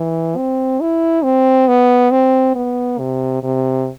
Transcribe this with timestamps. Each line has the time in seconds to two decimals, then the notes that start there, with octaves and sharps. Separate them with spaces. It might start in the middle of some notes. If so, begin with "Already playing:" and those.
Already playing: E3
0.37 C4
0.81 E4
1.24 C4
1.68 B3
2.11 C4
2.55 B3
2.99 C3
3.43 C3